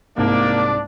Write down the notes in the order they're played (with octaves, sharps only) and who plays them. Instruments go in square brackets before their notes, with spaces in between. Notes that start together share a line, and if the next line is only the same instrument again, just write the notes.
[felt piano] C2 G#2 [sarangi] A#3 [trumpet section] D4 D5